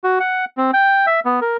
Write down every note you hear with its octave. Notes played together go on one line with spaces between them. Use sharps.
F#4
F#5
C4
G5
E5
B3
A#4